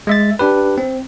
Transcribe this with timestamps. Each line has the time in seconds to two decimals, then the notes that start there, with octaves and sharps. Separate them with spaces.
0.07 G#3 E5 A6
0.39 D4 G4 B4
0.78 C4